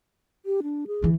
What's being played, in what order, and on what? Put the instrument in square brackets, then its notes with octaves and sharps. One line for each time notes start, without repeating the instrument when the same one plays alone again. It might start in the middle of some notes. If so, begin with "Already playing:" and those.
[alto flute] G4
D4
G#4
[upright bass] D3 E3